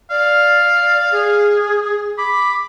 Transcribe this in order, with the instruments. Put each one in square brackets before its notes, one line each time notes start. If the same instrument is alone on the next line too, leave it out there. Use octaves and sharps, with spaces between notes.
[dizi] D5 [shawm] F5
[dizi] G#4
[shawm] B5 [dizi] D6